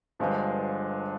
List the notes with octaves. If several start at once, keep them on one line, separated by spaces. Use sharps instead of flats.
G1 G2 F3 G#3